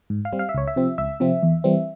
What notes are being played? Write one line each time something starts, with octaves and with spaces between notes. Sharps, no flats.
G#2
F5
G3 C4
F5
E5
C#2 C#5
E5
C3 F3 C4
C#2 E5
C3 F3 C4
E2
E3 G3 C4